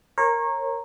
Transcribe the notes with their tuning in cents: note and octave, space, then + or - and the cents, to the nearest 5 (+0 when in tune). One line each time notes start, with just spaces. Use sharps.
A#4 +0 C#5 -30